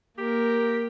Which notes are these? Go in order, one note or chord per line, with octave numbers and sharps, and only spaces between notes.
A#3 G4 A#4